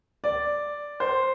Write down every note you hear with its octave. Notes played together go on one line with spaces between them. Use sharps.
D5
C5